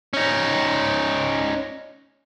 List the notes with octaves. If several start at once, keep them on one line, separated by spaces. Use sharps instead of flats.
C#4 D#4